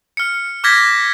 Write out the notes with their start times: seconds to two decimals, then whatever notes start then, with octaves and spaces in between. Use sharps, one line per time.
0.17 F6 C#7
0.64 D6 F6 G6 G#6 A#6 B6